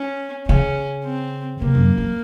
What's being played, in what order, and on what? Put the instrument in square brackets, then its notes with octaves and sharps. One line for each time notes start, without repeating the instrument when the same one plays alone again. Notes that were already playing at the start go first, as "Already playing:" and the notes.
Already playing: [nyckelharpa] C#4
[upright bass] C#3 [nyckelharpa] C#4
[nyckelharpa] C4
[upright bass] C3 [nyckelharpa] A#3
[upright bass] F#2
F#2